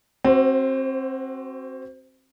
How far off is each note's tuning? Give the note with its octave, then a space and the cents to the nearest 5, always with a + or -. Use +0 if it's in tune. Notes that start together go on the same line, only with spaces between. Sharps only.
C4 +25 F#4 +25 C5 -15